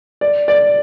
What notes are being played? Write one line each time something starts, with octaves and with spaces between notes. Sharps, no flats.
D5
D5